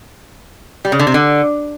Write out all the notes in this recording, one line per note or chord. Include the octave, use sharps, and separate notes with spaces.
G3
C#3
D3
C3
D3